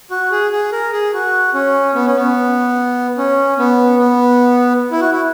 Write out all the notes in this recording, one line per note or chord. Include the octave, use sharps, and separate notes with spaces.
F#4
G#4
G#4
A#4
G#4
F#4
C#4
B3
C#4
B3
C#4
B3
B3
E4
F#4
E4